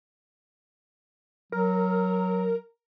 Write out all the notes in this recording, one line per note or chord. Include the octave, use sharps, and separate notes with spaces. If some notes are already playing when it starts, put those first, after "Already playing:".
F#3 A#4